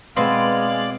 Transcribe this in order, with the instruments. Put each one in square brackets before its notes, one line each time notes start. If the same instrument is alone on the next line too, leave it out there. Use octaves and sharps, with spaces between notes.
[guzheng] B2 B3 C4 [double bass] G#3 [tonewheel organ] D5 [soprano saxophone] F5